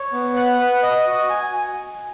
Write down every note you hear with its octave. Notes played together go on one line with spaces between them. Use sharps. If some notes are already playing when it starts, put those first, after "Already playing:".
Already playing: C#5
B3
F#5
B4
D#5
F#4
G#5